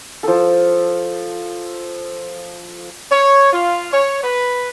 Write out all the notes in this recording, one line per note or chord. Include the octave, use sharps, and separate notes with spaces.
F3 A4
C#5
F4
C#5
B4